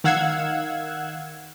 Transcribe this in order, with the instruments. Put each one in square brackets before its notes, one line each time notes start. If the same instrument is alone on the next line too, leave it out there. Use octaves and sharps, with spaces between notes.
[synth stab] D#3 F5 F#5 E6 F#6 G#6